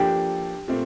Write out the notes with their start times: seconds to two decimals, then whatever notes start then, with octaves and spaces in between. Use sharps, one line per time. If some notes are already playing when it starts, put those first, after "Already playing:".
Already playing: F3 A#3 D4 G4 A4 G5
0.68 A#2 A3 C4